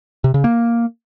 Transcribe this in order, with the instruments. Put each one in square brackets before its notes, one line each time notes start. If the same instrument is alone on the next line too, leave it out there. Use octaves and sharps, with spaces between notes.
[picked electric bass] C3
C#3
A#3